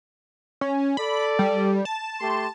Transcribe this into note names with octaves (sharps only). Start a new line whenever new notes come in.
C#4
A4 D5 B5
G3
A5
A3 G4 C6